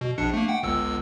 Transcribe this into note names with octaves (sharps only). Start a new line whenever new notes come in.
B2
A#1 D4 C#7
A3 A#3
F#5 G5
G1 C#2 E6